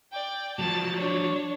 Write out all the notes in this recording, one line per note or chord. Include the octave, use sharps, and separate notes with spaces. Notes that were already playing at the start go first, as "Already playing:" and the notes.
D5 G5
F3 F#3 A5
D4 C#5